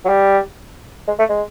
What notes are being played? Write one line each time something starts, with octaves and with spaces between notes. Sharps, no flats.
F#3
G3
G#3
A3
G#3